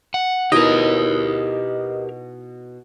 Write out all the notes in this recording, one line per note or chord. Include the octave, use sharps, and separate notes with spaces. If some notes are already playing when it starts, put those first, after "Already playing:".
F#5
B2 D#4 E4 G4 A#4 D#5